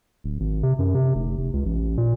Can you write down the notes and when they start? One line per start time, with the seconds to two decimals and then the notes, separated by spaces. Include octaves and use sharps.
0.24 D1
0.40 G#1
0.63 C3
0.79 F#2
0.95 C3
1.15 F1
1.38 F1
1.53 C#2
1.66 A1
1.97 A#2